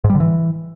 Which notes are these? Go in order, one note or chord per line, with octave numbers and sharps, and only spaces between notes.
G#2
G3
D3
E3